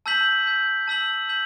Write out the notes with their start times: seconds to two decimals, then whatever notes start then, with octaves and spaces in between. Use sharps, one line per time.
0.06 A5 E6 G6 B6 F#7
0.46 A5 E6 G6 B6 F#7
0.88 A5 E6 G6 B6 F#7
1.29 A5 E6 G6 B6 F#7